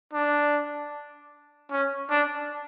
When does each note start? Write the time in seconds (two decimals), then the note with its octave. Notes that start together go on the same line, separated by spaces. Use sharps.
0.13 D4
1.71 C#4
2.10 D4